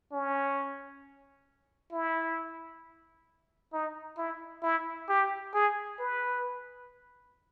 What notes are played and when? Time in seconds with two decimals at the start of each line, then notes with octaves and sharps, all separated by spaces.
0.12 C#4
1.92 E4
3.73 D#4
4.18 E4
4.63 E4
5.09 G4
5.54 G#4
5.99 B4